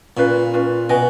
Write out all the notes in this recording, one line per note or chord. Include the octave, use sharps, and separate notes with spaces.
A#2 C#4 F4 B4 F5
C#4 F4 B4 F5
B2 F#4 B4 D#5 G#5